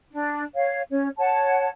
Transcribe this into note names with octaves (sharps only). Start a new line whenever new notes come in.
D4
C#5 F5
C#4 C#5
C#5 F#5 A5